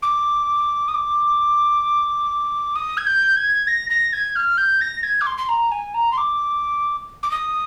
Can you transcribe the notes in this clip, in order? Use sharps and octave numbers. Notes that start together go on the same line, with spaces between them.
D6
D#6
D6
D#6
G#6
G6
G#6
A#6
A#6
G#6
F6
G6
A#6
G#6
D6
C6
C6
A#5
G#5
A#5
C6
D6
D6
D#6